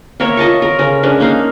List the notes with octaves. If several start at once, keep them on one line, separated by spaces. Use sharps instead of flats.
A#3 A#4 C#5 E5
F4 D#5 A5 C#6
A#4
C#3 C#4 A#4
G#3 C#4 D4
A#3 D#4 F5